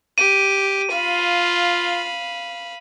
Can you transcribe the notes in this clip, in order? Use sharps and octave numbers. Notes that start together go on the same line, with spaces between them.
G4 D#7
F4 F5 B5